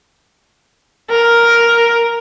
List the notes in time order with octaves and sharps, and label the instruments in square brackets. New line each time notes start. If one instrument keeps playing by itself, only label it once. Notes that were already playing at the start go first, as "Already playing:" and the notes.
[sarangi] A#4